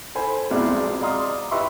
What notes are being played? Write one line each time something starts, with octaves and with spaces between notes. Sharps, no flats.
A4 C5 G#5 B5
B1 F2 G#3 B3 E4 D5
D5 D#5 F5 A#5 C6 D#6
G4 B4 D#5 E5 C6 C#6